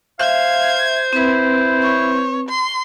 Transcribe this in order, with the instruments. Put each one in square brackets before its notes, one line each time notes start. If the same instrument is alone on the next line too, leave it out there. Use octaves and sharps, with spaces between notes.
[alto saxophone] C5 [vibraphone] E5 [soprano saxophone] F5 [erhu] G#6
[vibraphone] C4 B4 [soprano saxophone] E4
[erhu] C#5
C6